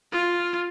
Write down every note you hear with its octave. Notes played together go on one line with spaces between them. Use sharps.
F4